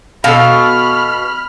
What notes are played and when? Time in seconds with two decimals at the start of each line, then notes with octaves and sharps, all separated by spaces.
0.24 B2 A4 F5 B5 F6